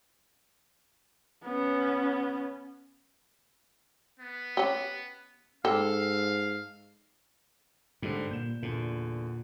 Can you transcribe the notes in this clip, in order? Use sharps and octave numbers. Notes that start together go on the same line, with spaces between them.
B3 C#4
B3
C#4 G4
G#2 G4 A4 F5
G#2 D3 G3
A#2 G6 E7
E2 A#2 D3